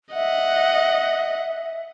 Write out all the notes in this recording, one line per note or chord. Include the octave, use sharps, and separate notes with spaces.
D#5 E5 F#5